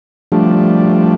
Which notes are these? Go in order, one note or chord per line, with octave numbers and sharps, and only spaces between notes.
F3 G3 A3 D4